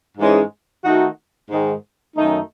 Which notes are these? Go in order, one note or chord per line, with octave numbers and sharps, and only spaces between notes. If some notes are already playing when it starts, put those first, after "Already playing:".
G#2 E3 G#3 C#4
D#3 A3 D#4 F#4
G#2 D#3 G#3
F#2 D#3 A3 D#4